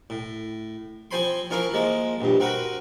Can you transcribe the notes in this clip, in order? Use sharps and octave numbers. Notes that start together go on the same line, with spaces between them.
A2
F3 C4 C5 G#5 B5 C6
F3 C#4 E4 A#4 F5
F3 G#3 A#3
A#1 G2
C4 F#4 A#4 B4